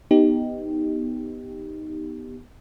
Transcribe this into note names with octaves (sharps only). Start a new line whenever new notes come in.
B3 D#4 G4